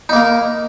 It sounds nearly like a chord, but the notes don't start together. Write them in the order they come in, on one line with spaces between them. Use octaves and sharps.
D#4 A#3 A#4